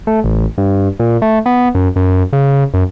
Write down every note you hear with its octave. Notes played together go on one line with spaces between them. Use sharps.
A3
A1
G2
A#2
A3
B3
F#2
F#2
C#3
F#2